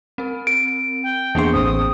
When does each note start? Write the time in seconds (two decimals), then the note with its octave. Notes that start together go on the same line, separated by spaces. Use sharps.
0.18 C4 A#4
0.47 D7
1.03 G5
1.35 E2 A#3 D4 G#4 C6
1.53 A1 C4 D#6